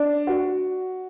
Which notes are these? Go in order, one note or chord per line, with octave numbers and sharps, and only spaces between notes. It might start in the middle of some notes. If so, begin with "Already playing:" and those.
Already playing: D4
F#4